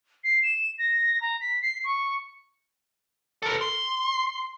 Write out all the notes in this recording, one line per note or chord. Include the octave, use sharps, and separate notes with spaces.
C7
E7
A#6
A#5
B6
C7
C#6
A4 A#4
C6